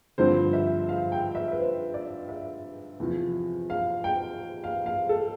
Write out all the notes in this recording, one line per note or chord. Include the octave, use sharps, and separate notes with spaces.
G2 D3 F3 C4 C5
E5
F5
G5
E5
B4
C5
D5
E5
E2 C3 F3
F5
G5
F5
F5
A4